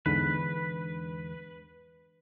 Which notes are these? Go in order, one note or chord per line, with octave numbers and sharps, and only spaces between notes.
E2 G#2 D3 B4